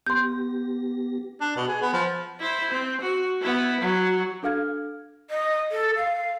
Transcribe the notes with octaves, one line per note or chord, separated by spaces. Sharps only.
B3 G4 C6 G6 A#6
D4
B2
G#4
B3
F3
E4 C5
C4
F#4
B3 E4
F#3
D4 A4 F5 F6 G#6
D#5
A4
F5